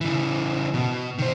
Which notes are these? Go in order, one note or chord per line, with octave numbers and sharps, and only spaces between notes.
C#3 E3
B2
D#3 C5